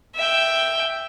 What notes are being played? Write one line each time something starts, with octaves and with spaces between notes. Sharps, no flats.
E5 G5